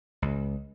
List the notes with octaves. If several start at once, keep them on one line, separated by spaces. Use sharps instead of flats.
C#2